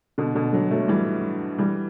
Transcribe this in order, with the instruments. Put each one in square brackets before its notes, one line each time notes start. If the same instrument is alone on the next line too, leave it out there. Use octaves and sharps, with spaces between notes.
[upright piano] B2 D3
B2 D3
D3 F#3
F#3 A3
E3 G3
E3 G3